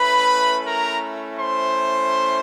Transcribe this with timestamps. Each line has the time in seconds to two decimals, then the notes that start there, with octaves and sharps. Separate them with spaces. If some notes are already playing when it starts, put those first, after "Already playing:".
Already playing: A3 C#4 E4 B4 B5
0.64 A#4 A#5
1.38 C5 C6